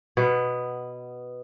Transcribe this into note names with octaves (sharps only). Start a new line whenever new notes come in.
B2 B3